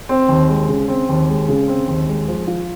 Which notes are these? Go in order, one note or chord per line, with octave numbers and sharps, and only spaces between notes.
C4
D#2
G#3
C#3
C4
D#2
G#3
C#3
C4
D#2
G#3
F3
F4